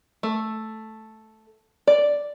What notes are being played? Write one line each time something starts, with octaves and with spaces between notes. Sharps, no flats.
A3
D5